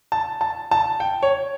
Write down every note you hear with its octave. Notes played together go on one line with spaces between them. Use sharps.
A5
A5
A5
G5
C#5